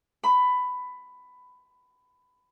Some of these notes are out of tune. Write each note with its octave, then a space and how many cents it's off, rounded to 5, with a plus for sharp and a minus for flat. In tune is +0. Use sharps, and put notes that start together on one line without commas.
B5 +15